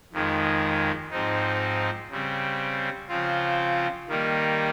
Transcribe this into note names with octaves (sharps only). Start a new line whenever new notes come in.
F2 D#3 G#3
G#2 F3 C4 D#4
C#3 G3 C4
C#3 F3 C4 F4
D#3 G3 A#3 D#4